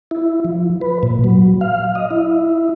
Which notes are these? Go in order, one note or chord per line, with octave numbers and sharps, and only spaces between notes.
E4
F3
B4
A#2
F#3
F5
D#5
E4